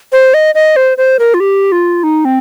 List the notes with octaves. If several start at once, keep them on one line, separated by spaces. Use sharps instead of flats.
C5
D#5
D#5
C5
C5
A#4
F4
G4
F4
D#4
C4